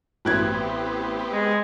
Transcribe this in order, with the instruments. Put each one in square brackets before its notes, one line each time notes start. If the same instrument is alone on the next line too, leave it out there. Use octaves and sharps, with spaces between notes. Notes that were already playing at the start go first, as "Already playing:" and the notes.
[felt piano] A1 F#6 G#6 [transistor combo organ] B3 C4 G4
[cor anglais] G#3